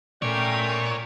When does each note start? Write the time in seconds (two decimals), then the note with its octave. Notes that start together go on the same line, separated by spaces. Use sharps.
0.22 A#2 A3 C#4 A#4 C#5 D5 G5